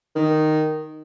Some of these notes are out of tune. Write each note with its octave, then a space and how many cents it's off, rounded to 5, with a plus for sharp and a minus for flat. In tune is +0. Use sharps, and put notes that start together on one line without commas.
D#3 -5